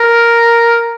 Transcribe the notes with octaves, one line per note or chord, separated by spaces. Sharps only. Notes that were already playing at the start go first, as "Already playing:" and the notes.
Already playing: A#4